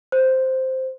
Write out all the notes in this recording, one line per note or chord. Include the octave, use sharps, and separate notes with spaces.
C5